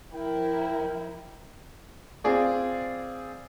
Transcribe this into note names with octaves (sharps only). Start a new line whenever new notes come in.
F3 E4 A#4 G5
C4 F4 G#4 D5